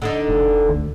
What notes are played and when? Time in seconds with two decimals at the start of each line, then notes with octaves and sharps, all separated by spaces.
0.02 D3 D4 D#4
0.29 F1
0.69 D2